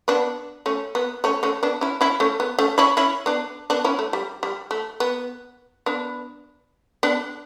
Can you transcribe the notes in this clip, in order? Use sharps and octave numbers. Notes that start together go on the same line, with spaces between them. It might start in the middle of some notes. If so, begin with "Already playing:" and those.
B3 D4
A3 C#4
B3
A3 C#4
A3 C#4
B3 D4
C#4 E4
C#4 E4
A3 C#4
B3
A3 C#4
C#4 E4
C#4 E4
B3 D4
B3 D4
C#4 E4
A3
G3
G3
A3
B3
B3 D4
B3 D4